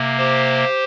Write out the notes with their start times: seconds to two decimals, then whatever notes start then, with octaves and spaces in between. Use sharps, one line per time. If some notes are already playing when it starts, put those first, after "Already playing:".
Already playing: C3 A#3
0.18 G4 C5